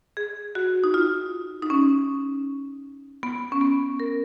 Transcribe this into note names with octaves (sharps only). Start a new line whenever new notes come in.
G#4
F#4
D#4
F4
D#4
C#4
B3
C#4
B3
A#4